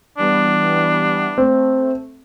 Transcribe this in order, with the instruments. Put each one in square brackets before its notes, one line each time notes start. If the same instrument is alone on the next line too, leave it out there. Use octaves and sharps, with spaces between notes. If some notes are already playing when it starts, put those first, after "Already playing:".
[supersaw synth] E3 G3 B3 [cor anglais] D4
[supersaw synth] A3 [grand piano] C4